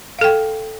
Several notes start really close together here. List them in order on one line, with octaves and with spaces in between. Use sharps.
F5 A4 G5